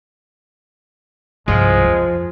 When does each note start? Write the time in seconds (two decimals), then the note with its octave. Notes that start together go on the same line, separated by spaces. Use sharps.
1.48 C2 G2 F3 G#3
1.85 F2